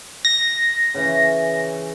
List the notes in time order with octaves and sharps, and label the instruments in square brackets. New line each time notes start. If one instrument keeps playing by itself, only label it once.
[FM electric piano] A#6
[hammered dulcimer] C#3 E3